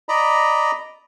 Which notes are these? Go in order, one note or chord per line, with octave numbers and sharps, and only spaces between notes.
D5 D#5 A#5 B5